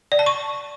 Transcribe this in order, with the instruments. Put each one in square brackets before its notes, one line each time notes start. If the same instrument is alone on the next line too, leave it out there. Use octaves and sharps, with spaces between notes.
[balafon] D5
A5
C#6